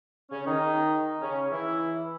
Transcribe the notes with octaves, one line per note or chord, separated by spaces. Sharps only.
C#3 C#4
D#3 D#4
C#3 C#4
E3 E4